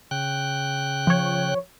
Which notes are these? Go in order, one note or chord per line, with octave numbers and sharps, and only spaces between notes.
C#3 G5 F#6
F3 C#5